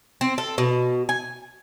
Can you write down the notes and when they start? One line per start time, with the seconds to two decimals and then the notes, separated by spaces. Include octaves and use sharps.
0.21 C4
0.38 A4
0.58 B2
1.09 G#5